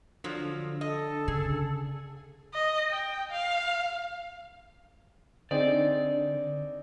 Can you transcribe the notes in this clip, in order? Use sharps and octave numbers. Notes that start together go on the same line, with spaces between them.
D3 F3 F#3
A4 D#5
C#3 G#4
D#5
G5
F5
D3 C4 D#4 G#4 D5